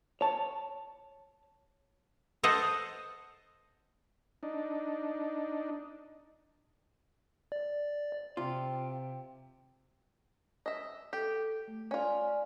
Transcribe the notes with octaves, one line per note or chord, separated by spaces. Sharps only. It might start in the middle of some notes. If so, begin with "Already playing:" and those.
C#5 A5
A4 C5 D#5 F#5
D4 D#4
D5
C3 F4 G5
D#5 E5
G4 A4
A3
C#4 F4 D5 G#5